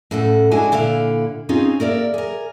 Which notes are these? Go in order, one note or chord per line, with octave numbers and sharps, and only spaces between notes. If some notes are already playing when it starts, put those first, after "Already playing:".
A2 C#3 A4 F#5
G#3 D4 E4 F#4 G#5
A#2 D3 E4 F5
C4 C#4 D#4 F4 G#4 C5
A#3 A#4 D5 E5
G#4 A#4